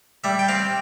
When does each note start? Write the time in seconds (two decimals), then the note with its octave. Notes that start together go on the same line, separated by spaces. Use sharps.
0.24 G3 E5
0.39 G5
0.48 C4 F5